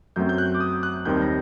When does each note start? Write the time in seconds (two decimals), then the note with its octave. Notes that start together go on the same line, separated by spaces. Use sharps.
0.16 F#2 F#3 A3 C4 G6
0.29 G6
0.38 F#6
0.55 D6
0.60 D#6
0.83 F#6
1.05 D#2 D#3 G3 C4 G6
1.22 A#6